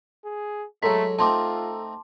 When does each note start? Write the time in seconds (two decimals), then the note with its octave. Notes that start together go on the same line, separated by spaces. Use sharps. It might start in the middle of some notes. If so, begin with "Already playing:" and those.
0.24 G#4
0.83 F#3 G#3 A3 A4 A#5 B6
1.19 A3 C4 D#4 F4 A5 C6 D6